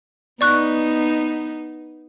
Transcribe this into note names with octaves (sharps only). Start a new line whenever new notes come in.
B3 D#4 D5 C#6 F#6